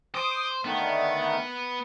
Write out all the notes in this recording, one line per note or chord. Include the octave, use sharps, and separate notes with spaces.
C5 D6 D#6
D3 D#3 A3 B3